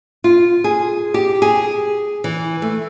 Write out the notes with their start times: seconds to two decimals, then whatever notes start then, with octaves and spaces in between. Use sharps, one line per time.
0.24 F4
0.64 G#4
1.14 G4
1.42 G#4
2.24 E3
2.62 A3